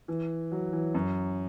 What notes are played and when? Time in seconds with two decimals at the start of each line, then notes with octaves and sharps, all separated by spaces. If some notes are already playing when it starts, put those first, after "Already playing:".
0.08 E3
0.52 F#3
0.73 E3
0.95 F#2